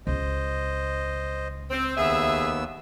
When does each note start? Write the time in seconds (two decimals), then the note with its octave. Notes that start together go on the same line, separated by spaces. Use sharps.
0.07 C#2 C5 D#5
1.70 C4
1.97 D#2 B3 G#4 E5 E6